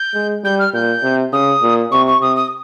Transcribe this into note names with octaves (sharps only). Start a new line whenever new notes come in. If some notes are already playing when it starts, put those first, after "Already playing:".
Already playing: G6
G#3
G3 G6
F6
A#2 G6
C3
C#3 D#6
A#2
C3 C#6
C#6
C3 D#6
D#6